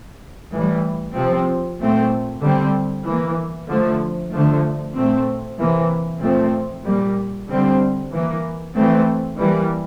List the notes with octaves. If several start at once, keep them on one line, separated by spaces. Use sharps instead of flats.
A2 E3 G3
C3 F3 C4
A#2 A3 C4
D3 G3 C4
E3 A#3
D3 F3 A3
D3 F3 A3
A#2 A3 C4
C3 E3 A#3
A#2 F3 A3 C4
A#2 G3 A#3
D3 G3 C4
E3 A#3
E3 A3 C4
E3 G3 A#3